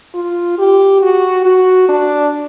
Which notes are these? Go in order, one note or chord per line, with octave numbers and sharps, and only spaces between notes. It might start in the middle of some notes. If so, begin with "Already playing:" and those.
F4
G4
F#4
F#4
D4